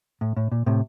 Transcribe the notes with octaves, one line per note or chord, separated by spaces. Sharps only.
A2
A2
A#2
A2 C3